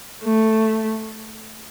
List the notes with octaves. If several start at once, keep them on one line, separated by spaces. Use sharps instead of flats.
A3